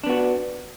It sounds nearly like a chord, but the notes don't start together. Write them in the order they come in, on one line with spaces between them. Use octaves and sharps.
D4 B3 F#4